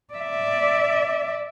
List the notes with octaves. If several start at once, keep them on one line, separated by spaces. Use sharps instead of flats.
D5 E5